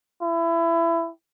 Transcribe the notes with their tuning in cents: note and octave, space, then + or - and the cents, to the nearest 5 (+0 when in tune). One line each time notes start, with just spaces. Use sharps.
E4 +25